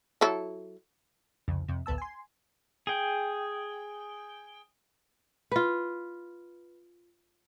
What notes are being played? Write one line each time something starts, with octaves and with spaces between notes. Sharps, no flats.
F#3 E4 A4
C2 F2 C#3
F2 C3
A1 D2 B3 A5 E6
G#5 C6
G#4 G5
F4 B4